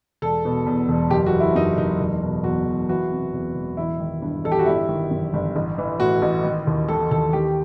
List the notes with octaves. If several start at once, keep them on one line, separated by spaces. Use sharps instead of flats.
E1 A4
B2
E2
E1
F#1 G4
F#4
E3
E4
F#2 D#4
F#1 D#4
E1
B2
E2 F#4
E1
E3 F#4
C3
E2
E1
A1 E4
D#3
G2
A1 A4
G4
F#4
G1 E4
D#3
F#2
G1
A1
E3
A2 F#4
A1
D#3
D#2
D#3 A4
D#2 A4
D#3 G4